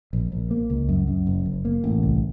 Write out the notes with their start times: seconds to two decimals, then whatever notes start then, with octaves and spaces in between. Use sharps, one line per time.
0.13 A#1
0.32 A#1
0.51 A#3
0.70 C#2
0.89 F#2
1.07 F#2
1.27 F#1
1.45 F#1
1.65 A#3
1.84 A1
2.03 C2